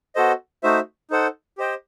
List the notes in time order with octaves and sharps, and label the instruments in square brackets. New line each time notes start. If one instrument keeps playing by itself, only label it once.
[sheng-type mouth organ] B3 F#4 A4 C5 D#5
A3 D#4 F#4 C5 E5
D#4 A4 C5 F#5
G4 C5 D#5 G5